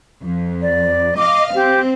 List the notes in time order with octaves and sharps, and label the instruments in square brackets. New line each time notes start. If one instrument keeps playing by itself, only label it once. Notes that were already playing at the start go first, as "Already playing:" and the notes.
[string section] F2
[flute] D5
[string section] D#5 F5 [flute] D6
[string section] C4 [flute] G4